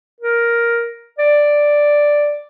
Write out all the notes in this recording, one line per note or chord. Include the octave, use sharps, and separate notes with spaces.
A#4
D5